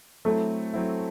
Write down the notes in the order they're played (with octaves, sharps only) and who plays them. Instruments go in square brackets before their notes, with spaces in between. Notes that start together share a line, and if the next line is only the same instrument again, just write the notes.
[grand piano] F#3 C4 E4 [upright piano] A3
[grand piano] F#3 C4 E4